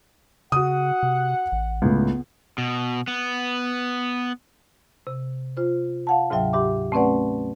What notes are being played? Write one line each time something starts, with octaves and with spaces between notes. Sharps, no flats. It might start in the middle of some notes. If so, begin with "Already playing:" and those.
C#3 F#4 F#5 D#6
C3
A1
C#2 A2 B3
B2
B3
C3
F4 C5
F5 F#5 A5
D2 G#2 C3 F#3 E5 G5
G#2 G4 E5 D6
A3 C4 C#4 B4 D5 F#5